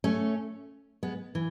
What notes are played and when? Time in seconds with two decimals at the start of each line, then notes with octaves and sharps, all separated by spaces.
0.04 A3 C#4
1.03 G#3 B3
1.35 E3